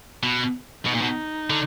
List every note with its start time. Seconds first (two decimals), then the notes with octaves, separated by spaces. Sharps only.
0.23 B2
0.86 B2 D#4
0.95 A#2
1.02 B2
1.50 D3